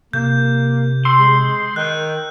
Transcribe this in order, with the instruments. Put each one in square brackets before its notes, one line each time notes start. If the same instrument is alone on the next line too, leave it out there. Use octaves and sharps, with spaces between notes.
[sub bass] C3 [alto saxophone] A#3 [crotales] G6
[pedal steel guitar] C6 [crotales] E6
[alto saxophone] G#3
[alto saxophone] D#3 [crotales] F#6